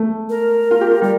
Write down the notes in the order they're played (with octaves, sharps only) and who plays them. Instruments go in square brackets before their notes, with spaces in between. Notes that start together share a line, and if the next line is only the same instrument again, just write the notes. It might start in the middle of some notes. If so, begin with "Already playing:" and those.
Already playing: [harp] A3
[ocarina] A#4
[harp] F4
G4
F4
[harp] G3 [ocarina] A#4